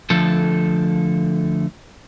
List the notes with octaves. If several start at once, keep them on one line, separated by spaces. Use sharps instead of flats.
D3 F3 A3 A4